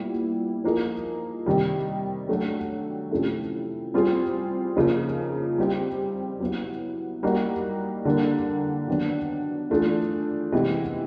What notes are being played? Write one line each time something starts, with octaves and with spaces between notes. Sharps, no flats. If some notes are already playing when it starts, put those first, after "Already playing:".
Already playing: A#2 G3 B3 E4
F3 A#3 D#4 G#4
C3 D#3 G3
F#3 A3 D4 F#4
C3 F3 A3 C#4 E4
G3 C4 F4 G#4
C#3 F3 A#3 D#4
G3 C4 D#4 G4
F#3 B3 E4
G3 A#3 D#4 F#4
D3 G3 A#3 D4
D#3 F#3 B3 D4
E3 A3 D4 F4 G#4
C3 E3 G#3 B3 E4